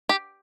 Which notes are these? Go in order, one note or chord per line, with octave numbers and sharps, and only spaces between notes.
G4